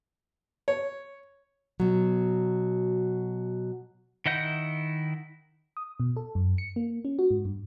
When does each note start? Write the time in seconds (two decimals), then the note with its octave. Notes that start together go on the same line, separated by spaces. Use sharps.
0.68 C#5
1.80 B2 F#3
4.26 D#3 E4 D#5 F#5 G6
5.77 D#6
6.00 B2
6.16 A4
6.35 F#2
6.58 C#7
6.76 A#3
7.05 C#4
7.19 F#4
7.31 G#2
7.45 G2